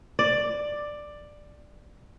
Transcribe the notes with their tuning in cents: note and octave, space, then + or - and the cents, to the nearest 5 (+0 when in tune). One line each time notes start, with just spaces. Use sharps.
D5 +10